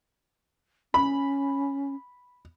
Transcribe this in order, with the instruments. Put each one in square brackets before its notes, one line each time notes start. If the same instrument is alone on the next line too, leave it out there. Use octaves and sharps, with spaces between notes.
[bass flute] C#4 [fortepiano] B5